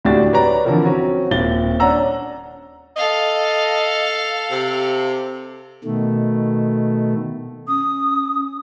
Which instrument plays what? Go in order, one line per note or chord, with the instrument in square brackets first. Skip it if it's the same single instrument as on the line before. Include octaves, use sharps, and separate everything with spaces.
[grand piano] D2 A2 D4 F#4 G4 A6
B4 C#5 D5 A#5
D3 E3 F3 C4 E4 A#4
C4 C#4 F#4 A#5
D#1 C4 A6 G7
C#4 D4 C#5 F#5 A#5 E6
[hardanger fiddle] A4 F5 [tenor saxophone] D#5
[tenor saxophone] C3
[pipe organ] B2 D#3 A3
[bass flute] C#4 [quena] D#6